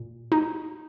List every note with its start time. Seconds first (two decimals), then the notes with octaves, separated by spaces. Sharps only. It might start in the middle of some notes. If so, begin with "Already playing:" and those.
Already playing: A#2
0.32 D#4